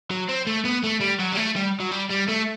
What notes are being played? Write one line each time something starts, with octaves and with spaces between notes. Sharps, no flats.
F#3
C4
A3
B3
A3
G3
F#3
G3
A3
G3
F#3
G3
G3
A3